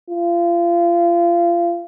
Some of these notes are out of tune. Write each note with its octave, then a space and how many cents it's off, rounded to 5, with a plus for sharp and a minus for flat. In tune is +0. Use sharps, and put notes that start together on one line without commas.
F4 -30